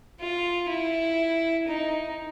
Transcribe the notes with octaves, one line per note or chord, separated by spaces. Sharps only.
F4
E4
D#4